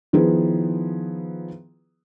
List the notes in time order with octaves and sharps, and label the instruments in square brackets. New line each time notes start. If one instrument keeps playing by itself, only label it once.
[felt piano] D#3 F3 B3 E4 G#4 B4